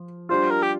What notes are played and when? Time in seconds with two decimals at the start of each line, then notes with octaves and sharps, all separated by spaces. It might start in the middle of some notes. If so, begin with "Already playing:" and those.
Already playing: F3
0.29 G3 D4 F4 C5
0.51 A#4
0.63 G4